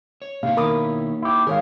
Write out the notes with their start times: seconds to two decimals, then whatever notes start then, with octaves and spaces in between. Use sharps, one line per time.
0.22 C#5
0.43 C3 A#3 D#4 C#5 F5
0.57 B2 D#3 E4 A#4 D6 D#6
1.22 E4 G4
1.47 D#3 F#3 G#3 G#4 A#4 C#5 F5